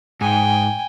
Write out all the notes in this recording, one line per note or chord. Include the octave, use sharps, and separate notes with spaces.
G#2 G5 G#5